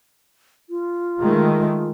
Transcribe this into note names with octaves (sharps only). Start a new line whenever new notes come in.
F4
D#3 G#3 A3